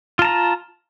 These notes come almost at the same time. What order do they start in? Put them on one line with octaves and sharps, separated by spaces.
F4 A5 A#5